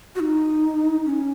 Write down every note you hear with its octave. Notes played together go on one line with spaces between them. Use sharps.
F#4
D#4
C#4